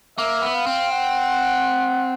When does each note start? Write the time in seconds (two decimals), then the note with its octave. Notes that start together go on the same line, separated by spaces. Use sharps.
0.18 A#3 E5
0.42 B3
0.55 F5
0.66 C4
0.92 F#5